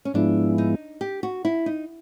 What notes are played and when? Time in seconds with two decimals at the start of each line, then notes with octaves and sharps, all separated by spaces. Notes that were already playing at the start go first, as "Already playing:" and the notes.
0.05 C#4
0.14 G#2 F3 G#3 B3 D4 E4
0.58 D#4
1.01 G4
1.23 F#4
1.45 E4
1.66 D#4